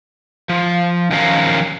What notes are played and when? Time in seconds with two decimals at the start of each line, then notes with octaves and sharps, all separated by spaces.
0.49 F3
1.11 D#3 F3 F#3 C#4 A#4 F5